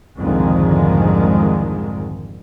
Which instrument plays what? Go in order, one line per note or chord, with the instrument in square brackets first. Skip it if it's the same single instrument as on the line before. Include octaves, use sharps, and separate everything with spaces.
[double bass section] C2 F2 G#2 D3 D#3 G#3